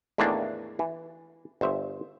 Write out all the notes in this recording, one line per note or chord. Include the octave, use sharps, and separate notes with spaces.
E2 A2 D#3 E3 A#3 D4
E3
G1 C5 E5